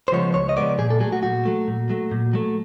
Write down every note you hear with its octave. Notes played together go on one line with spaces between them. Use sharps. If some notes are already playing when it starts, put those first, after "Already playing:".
C5
C#3 F3 G#3 B3 C#5
C#2 C#5
D#5
C#3 F3 G#3 B3 D5
A#2 G#4
A4
F#3 A3 G#4
F#4
A#2 F#4
F#3 A3
A#2
F#3 A3
A#2
F#3 A3